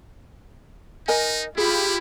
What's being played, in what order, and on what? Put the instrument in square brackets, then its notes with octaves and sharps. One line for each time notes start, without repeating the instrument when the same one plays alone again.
[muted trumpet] D#4 [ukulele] A#4 D#5 G#5
[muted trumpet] E4 [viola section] F4 G4 B5 [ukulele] G#4